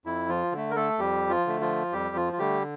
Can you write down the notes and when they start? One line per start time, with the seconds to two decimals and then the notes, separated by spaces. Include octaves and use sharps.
0.06 F2 E4
0.29 F3 F4
0.52 D3 A3
0.71 A#4
0.76 A3 A4
0.99 F2 G3 G4
1.30 F3 F4
1.46 D3 A3
1.61 F3 F4
1.93 F2 G3 G4
2.16 F3 F4
2.33 F4
2.39 D3 G3 A3 G4